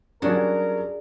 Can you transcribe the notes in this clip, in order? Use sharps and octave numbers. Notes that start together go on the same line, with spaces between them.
F#3 G3 C#4 D4 F#4 G#4 A#4